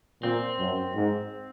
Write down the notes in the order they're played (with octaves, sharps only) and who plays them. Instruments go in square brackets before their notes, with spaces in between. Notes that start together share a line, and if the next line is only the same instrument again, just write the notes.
[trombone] A#2 [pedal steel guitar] C4
[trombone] F#2
G#2